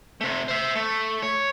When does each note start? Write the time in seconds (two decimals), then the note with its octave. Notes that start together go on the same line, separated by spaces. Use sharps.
0.21 C3 A3
0.48 C5 E5
0.75 A3
1.22 C#5